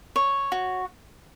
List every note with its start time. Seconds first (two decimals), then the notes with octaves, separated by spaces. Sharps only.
0.16 C#5
0.52 F#4